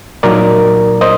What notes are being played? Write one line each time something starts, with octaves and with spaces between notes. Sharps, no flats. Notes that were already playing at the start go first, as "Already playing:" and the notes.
A#2 F#3 A#3 D#4 A#4 D5
C5 D#5